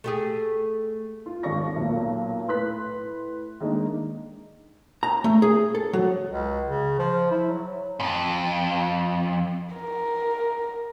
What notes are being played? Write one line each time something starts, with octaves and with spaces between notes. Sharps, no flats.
A3 G4 G#4
F4
G#1 D#2 A4 D5 C#6 A#6
B1 A#2 A#3
A2 B4 C6 F#6 B6
D#3 G#3 A#3 D4 D#4
A#5
A3
G#4
A4
F#3
C#2
C#3
F3
E4
F#3
F2 G#2
A#4